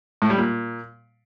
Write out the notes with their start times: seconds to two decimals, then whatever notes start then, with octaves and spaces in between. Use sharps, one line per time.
0.22 A2
0.30 G3
0.38 A#2